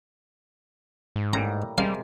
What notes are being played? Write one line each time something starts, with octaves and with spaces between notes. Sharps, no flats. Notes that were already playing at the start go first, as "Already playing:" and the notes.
G#2
A2 G3 A#3 A#5
C3 G3 G#3 A#3 F5